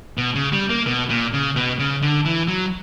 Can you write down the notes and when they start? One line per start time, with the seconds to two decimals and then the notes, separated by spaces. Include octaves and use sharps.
0.17 B2
0.35 C#3
0.53 G3
0.70 A#3
0.87 B2
1.10 A#2
1.33 C#3
1.56 B2
1.79 C#3
2.02 D3
2.25 E3
2.48 F#3